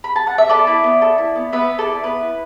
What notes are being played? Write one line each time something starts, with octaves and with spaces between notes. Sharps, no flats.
B5
A5
F#5
E5
B3 A4 D5
E4
B3
A4
E4
B3
B3 B4 E5
B3
A4 D5
E4
B3 B4
E4